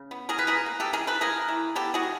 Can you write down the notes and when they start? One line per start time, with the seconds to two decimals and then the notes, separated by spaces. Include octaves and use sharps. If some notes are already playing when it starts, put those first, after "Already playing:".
Already playing: C#3
0.11 B3
0.29 G#4 A#4
0.38 B2 B4
0.47 G#4 A#4
0.66 A#3
0.80 G4 A4
0.93 D#3 G#4 A#4
1.07 A4 B4
1.21 A#3 G#4 A#4
1.48 E3
1.76 B3 G4 A4
1.94 F#4 G#4
2.03 D#3